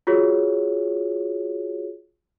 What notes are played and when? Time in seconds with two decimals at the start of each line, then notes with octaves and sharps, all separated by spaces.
0.07 F4 F#4 G#4 C#5